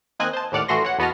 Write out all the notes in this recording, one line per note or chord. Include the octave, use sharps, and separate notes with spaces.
D#3 A#3 C4 D#5 G#5 F#6
C5 A5
D#2 A2 D5 F#5 F6
A1 E3 A3 F#4 C6 A#6
C#5 F#5
E2 B3 F#4 D#5 A5 F6